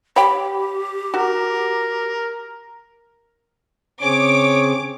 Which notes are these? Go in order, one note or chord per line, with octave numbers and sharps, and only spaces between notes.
G4 C#5 G5 B5
F#4 A#4
C#3 C4 G#4 C#5 D6